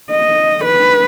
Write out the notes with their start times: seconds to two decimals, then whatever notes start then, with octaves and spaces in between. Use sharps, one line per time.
0.11 D#5
0.65 B4